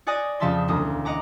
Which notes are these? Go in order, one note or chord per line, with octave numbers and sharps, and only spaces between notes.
C#5 D5 G#5 D#6 F#6 A#6
F2 C#3 F3 E5 A5 C6
E1 D2 A#3 D#6
D#5 F#5 A#5 D6